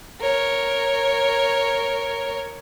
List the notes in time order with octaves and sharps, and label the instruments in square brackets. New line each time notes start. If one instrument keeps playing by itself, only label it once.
[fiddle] A#4 C#5